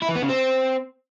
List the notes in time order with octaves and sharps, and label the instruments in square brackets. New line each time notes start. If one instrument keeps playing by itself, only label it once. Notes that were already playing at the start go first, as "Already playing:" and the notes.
[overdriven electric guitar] E4
E3
B3
C#3
C4